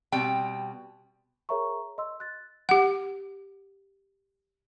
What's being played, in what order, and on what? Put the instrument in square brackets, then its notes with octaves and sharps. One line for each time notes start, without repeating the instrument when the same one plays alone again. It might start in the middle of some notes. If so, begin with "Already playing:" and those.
[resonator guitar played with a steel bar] B2 G3 C4 G5
[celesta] G#4 A#4 C#5 E5 A#5 C#6
D#5 C6 E6
F#6 A6
[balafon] G4 F#5